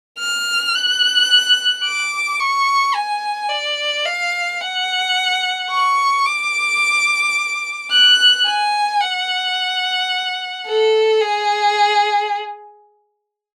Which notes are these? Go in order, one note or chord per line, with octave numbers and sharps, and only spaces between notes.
F6
F#6
D6
C#6
G#5
D5
F5
F#5
C#6
D6
F#6
G#5
F#5
A4
G#4